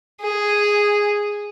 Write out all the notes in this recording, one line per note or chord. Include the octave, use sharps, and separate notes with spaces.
G#4